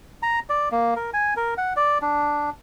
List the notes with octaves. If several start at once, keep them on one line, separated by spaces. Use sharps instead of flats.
A#5
D5
A#3
A#4
G#5
A#4
F#5
D5
D4